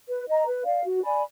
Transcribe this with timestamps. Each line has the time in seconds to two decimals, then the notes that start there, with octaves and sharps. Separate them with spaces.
0.08 B4
0.27 D#5 A#5
0.46 B4
0.65 D5 F5
0.84 F#4
1.03 D5 G#5 B5